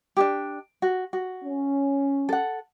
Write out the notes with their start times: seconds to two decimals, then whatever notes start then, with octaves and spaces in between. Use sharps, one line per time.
0.17 D4 D#4 G4
0.82 F#4
1.13 F#4
1.44 C#4
2.29 A4 F#5